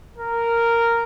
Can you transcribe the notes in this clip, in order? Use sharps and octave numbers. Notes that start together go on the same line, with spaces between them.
A#4